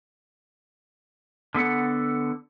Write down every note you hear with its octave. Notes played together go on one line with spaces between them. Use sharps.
D3 B3 A4 F#5